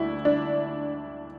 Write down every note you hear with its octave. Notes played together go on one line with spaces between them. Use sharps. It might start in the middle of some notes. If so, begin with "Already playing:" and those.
Already playing: D2 D4 E4
D4